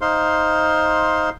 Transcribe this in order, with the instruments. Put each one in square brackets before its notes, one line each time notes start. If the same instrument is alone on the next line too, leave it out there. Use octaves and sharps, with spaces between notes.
[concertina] D#4 C5 F5 C6